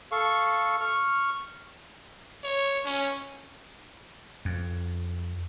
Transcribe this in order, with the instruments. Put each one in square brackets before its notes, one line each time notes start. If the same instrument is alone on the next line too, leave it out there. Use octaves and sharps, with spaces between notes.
[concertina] A4 F5 C#6
C#6 F6
[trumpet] C#5
C#4
[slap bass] F2